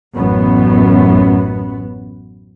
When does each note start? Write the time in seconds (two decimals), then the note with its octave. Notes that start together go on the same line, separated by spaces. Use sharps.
0.13 A1 F#2 B3